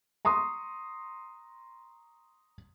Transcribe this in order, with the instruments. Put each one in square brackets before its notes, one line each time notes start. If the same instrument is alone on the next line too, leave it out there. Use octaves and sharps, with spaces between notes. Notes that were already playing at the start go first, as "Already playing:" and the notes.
[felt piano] A#5 C6 C#6 D#6